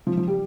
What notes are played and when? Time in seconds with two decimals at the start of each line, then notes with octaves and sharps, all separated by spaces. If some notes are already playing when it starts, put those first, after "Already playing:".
0.07 F3
0.17 F3
0.28 G3